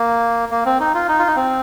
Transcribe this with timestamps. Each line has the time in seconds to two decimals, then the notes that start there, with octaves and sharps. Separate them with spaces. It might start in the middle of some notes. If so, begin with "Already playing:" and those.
Already playing: A#3
0.51 A#3
0.65 C4
0.80 D#4
0.94 F4
1.08 D#4
1.19 F4
1.27 D#4
1.36 C4